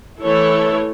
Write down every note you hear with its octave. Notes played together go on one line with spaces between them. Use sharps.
E3 A3 E4 A4 C#5